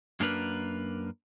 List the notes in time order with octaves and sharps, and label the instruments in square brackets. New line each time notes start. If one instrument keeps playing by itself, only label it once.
[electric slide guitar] F#2 A#3 D4 A#4 B4